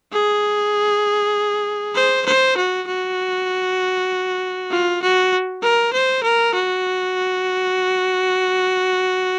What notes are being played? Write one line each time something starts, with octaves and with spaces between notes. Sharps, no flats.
G#4
C5
C5
F#4
F#4
F4
F#4
A#4
C5
A#4
F#4